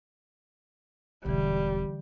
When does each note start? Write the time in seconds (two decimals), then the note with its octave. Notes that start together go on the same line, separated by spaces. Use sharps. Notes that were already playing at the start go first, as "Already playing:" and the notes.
1.25 E1 B1 D3 E3 G3